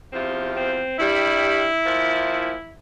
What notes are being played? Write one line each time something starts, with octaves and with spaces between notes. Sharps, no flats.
E2 C3 F3 C4
C4
G2 G3 E4
A#2 F3